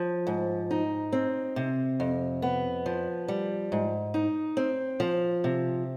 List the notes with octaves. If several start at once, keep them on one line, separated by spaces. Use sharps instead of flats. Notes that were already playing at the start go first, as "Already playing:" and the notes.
Already playing: F3
G#2
D#4
C4
C3
F2
B3
F3
G3
G#2
D#4
C4
F3
C3